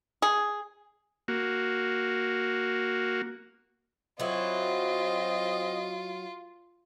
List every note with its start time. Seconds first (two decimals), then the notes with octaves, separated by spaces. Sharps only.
0.22 G#4
1.28 A#3 F#4
4.20 F#3 C4 E4 F4 D#5